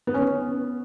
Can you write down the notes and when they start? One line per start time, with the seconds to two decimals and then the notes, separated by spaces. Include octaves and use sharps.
0.07 B3
0.14 C#4
0.21 B3